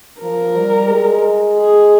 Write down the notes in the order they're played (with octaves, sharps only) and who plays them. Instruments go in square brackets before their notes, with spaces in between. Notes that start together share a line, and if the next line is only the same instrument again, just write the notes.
[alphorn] F3 [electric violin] A#4
[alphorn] G3
G#3
[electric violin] G#4